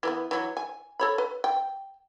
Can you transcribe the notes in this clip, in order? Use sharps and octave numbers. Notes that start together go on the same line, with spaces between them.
E3 A#3 B3
E3 F#3
G#5
A4 C#5 B5
B4
G5